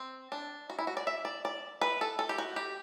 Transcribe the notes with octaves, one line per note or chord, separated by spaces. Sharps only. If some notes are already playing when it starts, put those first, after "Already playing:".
Already playing: C4
D4
F#4
E4
F#4
D5
E5
D5
D5
B4
A4
A4
G4
F#4
G4